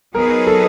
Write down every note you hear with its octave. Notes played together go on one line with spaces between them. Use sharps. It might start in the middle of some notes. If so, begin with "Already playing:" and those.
F#3 B3 D#4 G#4 A#4 B4
A4